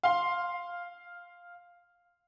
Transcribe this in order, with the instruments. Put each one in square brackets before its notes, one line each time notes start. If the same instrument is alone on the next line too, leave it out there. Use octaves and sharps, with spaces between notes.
[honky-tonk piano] F5 C6